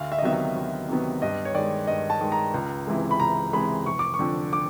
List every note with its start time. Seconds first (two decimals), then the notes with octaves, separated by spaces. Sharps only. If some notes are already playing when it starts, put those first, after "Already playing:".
Already playing: D2 F5
0.12 E5
0.18 D#5
0.22 C3 D#3 F#3 B3 E5
0.33 E5
0.56 D2
0.88 C3 D#3 F#3 B3
1.22 G2 D#5
1.45 C#5
1.54 D#3 G#3 D5
1.87 G2 D#5
2.10 A5
2.21 D#3 G#3
2.32 A#5
2.54 C#2
2.87 C3 E3 G#3
3.11 B5
3.20 C#2 A#5
3.53 C3 E3 G#3 B5
3.86 F1 C#6
3.99 D6
4.14 C#6
4.19 F2 D3
4.53 D6